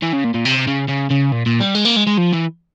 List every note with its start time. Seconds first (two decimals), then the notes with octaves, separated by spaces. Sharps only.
0.02 E3
0.13 C#3
0.24 A#2
0.34 A#2
0.45 C3
0.67 C#3
0.88 C#3
1.10 C#3
1.32 A#2
1.46 A#2
1.61 G3
1.75 G#3
1.85 A#3
1.97 G#3
2.07 G#3
2.18 F3
2.33 E3